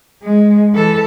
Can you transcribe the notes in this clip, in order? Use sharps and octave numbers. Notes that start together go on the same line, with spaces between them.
G#3
E3 A4